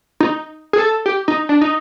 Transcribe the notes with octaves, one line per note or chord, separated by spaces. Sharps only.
D#4
G#4
A4
G4
D#4
D4
D#4